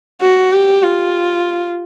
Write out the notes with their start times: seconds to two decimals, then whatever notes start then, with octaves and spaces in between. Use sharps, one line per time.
0.21 F#4
0.52 G4
0.83 F4